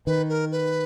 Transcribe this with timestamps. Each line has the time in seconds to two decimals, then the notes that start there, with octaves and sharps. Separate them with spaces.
0.06 D#3 B4
0.29 A#4
0.52 B4